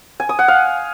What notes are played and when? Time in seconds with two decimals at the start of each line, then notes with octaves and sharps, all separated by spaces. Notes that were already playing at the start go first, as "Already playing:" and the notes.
0.20 G#5
0.29 D#6
0.39 F#5
0.48 F5